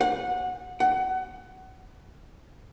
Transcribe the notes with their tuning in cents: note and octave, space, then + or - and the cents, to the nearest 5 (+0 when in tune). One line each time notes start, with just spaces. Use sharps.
F#5 -20
F#5 +25